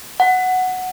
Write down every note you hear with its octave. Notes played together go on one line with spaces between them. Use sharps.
F#5